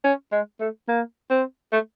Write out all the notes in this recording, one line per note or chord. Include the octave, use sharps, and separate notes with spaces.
C#4
G#3
A3
A#3
C4
A3